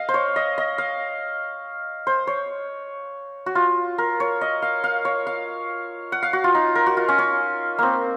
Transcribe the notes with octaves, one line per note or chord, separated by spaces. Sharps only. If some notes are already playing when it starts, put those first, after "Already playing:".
Already playing: D#5 F5
C5
C#5
D#5
D#5
F5
C5
C#5
F#4
F4
A#4
C#5
D#5
F5
F5
C#5
F5
F#5
F5
F#4
F4
D#4
A#4
F#4
F4
C#4
C#4
A#3 C4